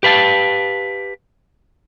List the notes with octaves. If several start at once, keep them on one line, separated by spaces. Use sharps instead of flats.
G4 B4 F5 A5